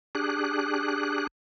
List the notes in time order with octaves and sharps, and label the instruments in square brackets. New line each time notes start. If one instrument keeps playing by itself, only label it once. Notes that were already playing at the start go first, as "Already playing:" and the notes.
[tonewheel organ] D4 G4 G#4 F#6